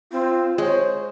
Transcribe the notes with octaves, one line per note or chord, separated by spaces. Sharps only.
C4 F4
G#3 C5 C#5